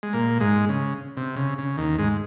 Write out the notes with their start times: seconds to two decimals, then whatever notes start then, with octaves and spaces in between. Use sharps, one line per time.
0.03 G#3
0.13 A#2 A#3
0.41 G#2 G#3
0.69 C#3
1.17 C3
1.36 C#3
1.58 C#3
1.77 D#2 D#3
1.98 G#2 G#3